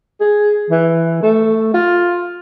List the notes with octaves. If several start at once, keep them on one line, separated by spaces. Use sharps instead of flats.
G#4
E3
A3
F4